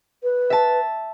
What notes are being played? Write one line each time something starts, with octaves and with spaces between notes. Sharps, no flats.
B4
E5 A5